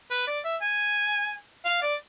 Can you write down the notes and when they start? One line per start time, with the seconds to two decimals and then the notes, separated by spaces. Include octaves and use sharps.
0.10 B4
0.27 D5
0.44 E5
0.62 G#5
1.65 F5
1.82 D5